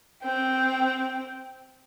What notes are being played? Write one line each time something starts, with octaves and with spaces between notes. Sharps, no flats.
C4 G5